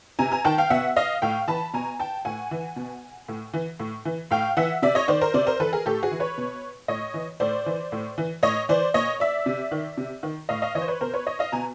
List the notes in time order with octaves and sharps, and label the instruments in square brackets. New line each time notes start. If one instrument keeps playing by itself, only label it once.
[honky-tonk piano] C3 G#5 A#5
G#5 A#5
D#3 G5 A5
F5 G5
B2 E5 F#5
D#5 F5
A2 F5 G5
E3 A5 B5
B2 G#5 A#5
G5 A5
A2 F#5 G#5
E3
B2
A2
E3
A2
E3
A2 F5 G5
E3 E5 F#5
C3 D5 E5
C#5 D#5
D#3 C5 D5
A#4 C5
C3 C5 D5
A#4 C5
E3 A4 B4
G#4 A#4
A2 G4 A4
F#4 G#4
E3
B4 C#5
B2
A2 C#5 D#5
E3
A2 C5 D5
E3
A2
E3
A2 C#5 D#5
E3 C5 D5
A#2 C#5 D#5
D5 E5
C3
D#3
C3
D#3
A2 D#5 F5
D#5 F5
E3 C#5 D#5
C5
B4 C#5
B2 A#4 C5
B4 C#5
C#5 D#5
D#5 F5
B2 G#5 A#5